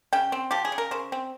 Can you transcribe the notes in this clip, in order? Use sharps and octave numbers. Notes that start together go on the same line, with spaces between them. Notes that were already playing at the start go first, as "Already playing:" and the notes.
C#3 G5
C4
F3 G4
G#4
C#3
A#4
C#3 C5
C4